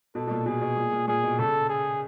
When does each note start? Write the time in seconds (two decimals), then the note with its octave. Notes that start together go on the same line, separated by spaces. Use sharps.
0.15 B2 A4
0.27 B2
0.31 A#2
0.46 B2 G#4
0.61 B2
0.77 A#2
0.92 A#2
1.08 A#2 G#4
1.24 B2
1.39 C#3 A4
1.69 G#4